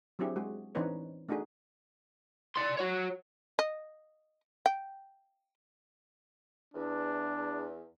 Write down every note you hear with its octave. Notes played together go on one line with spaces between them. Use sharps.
F#3 C4 D4 E4 G4 G#4
G#3 F#4 G#4
E3 C4 D4 D#4 B4 C#5
A3 D4 D#4 F#4 G#4
D5 C6
F#4 C#5
D#5
G5
E2 D4